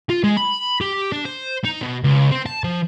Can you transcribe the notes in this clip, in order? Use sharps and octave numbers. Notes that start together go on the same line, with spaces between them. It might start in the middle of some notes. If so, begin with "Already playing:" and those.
F4
G#3
B5
G4
D4
C5
D#4
B2
C#2
C4
A5
F3